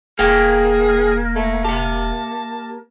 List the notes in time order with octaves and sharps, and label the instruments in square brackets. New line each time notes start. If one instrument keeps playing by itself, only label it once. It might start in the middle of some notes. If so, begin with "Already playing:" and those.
[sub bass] E1 [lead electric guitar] A#3 [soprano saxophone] G#4 [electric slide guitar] A4 G5
[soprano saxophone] A3
[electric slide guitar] G4 E5 [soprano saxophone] A5